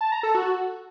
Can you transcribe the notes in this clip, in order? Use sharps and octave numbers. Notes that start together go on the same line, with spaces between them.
A5
A#5
A4
F#4